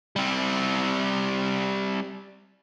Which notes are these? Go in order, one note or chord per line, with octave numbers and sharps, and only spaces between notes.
G3 C4